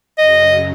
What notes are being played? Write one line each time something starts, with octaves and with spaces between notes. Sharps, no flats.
F#2 C#3 F#3 D#5